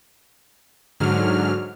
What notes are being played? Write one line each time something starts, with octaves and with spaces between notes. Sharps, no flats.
G#2 D3 F#3 F6